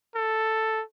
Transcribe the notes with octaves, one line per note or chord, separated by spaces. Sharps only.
A4